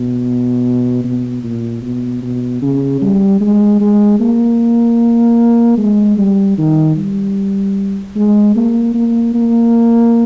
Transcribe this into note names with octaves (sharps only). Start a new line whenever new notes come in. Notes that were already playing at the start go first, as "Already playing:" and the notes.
Already playing: B2
B2
A#2
B2
B2
C#3
G3
G#3
G#3
A#3
G#3
G3
D#3
G3
G#3
A#3
A#3
A#3